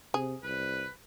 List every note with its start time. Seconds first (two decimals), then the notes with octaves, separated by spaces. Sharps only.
0.14 C3 G#4
0.43 C2 B4